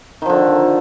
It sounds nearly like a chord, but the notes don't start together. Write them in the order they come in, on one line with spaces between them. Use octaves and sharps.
D#3 F3 D3